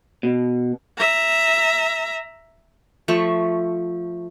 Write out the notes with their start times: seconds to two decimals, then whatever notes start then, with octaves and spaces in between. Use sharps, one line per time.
0.23 B2
0.98 E5 A#5
3.08 F3 A3 E5 C#6